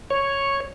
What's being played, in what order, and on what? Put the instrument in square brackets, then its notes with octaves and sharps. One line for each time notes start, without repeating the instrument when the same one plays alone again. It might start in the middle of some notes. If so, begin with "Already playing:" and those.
[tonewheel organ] C#5